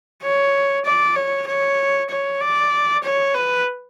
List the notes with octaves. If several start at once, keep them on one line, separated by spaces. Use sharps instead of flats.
C#5
D5
C#5
C#5
C#5
D5
C#5
B4